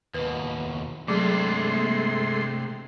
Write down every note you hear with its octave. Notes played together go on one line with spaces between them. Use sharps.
D#2 B2 B4
C3 F#3 G#3 A3 C#4 D4 G#4 C6
G3 A#3